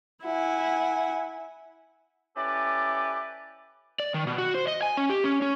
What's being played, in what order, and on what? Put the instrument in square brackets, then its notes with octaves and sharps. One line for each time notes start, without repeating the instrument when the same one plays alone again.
[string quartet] E4 F#5 G#5
[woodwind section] C#4 E4 G4 A4 B4 D5
[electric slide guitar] D5
D#3
B2
F#4
C5
D#5
G#5
C#4
G4
C#4
C#4